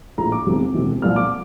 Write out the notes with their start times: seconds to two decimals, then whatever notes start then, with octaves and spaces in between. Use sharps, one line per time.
0.18 A#1 A2 F3 A#5
0.32 D6
0.47 F1 E2 C3 F3
0.74 E1 D2 C3 E3
1.02 C2 A#2 F3 F6
1.16 D6